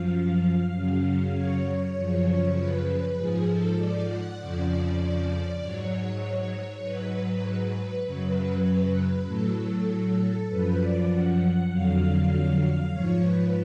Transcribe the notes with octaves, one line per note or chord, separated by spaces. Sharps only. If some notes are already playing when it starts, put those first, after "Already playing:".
Already playing: F#2 F3 F5
F#2 C#3 F#3
C#5
F#2 C#3 F3
B4
B4
G#2 F3 G#4
A4
D5
F#5
F2 C#3 F3 D5
G#2 F#3 C#5
G#2 F#3 B4
F#2 C#3 F#3 B4
A2 F#3 A4
F#2 F3 B4
D5
F#5
F2 D3 F#3 F5
G#2 F3 C#5
B4